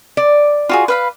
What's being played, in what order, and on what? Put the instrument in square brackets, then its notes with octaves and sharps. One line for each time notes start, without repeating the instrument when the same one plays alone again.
[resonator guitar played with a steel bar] D5
[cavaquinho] F4 F#4 G#4
B4 F5 B5